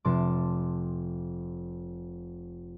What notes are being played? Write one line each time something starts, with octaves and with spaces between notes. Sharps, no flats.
F1 A5 C6 D6